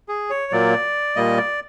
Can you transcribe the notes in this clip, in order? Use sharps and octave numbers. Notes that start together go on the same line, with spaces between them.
G#4
C#5
A#2 F#3 A#3 D5
A#2 G3 A#3 D#5
D5